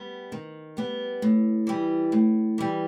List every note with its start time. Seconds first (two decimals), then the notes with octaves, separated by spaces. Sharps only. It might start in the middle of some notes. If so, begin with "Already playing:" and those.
Already playing: G3 B3
0.32 D#3
0.77 G3 B3
1.22 A2
1.67 E3 G3
2.12 A2
2.58 E3 G3